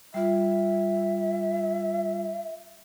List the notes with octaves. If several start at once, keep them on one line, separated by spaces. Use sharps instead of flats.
G3 F4 E5